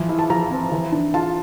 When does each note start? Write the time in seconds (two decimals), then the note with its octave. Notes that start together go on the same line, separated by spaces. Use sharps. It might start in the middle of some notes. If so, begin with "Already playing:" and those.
Already playing: E3 F3
0.09 E4
0.19 A5
0.30 F3 A#5
0.50 C4
0.72 E3
0.92 D4
1.14 F4 A5